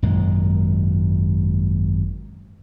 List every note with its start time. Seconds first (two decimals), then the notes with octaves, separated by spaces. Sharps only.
0.02 G#1 F#2 A#2 G#3